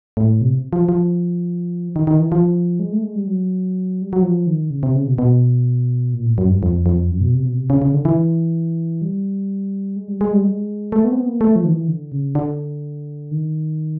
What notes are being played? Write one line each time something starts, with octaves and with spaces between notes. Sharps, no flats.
A2
C3
F3
F3
D#3
D#3
E3
F3
G#3
A3
G#3
G3
F#3
G3
F#3
F3
D#3
C#3
C3
C#3
B2
B2
A#2
A2
F#2
G2
F2
F2
F#2
B2
C3
B2
C3
C#3
C#3
D3
E3
G3
G#3
G3
G#3
G3
G#3
A3
B3
C4
B3
A#3
A3
F3
D#3
E3
D3
C#3
D3
D#3